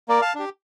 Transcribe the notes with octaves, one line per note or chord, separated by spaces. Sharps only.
A#3 A#4 D5
F5 A5
D4 G4